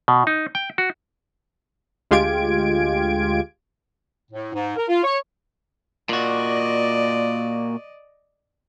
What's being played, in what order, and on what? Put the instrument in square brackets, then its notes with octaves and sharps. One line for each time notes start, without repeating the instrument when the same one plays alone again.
[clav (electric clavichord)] B2
D#4
G5
F#4
[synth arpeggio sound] D2 G#3 F4 G4 G#6 D7
[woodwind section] A2
G#2
A#4
F4
C#5
[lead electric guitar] A#2 F#4 [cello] D5 D#5